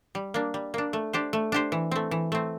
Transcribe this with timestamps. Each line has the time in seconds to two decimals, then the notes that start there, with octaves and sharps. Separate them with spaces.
0.15 G3
0.34 A#3 D4
0.54 G3
0.74 A#3 D4
0.93 A3
1.13 D4 G4 C5
1.33 A3
1.52 D4 G4 C5
1.72 E3
1.91 A3 C4
2.11 E3
2.32 A3 C4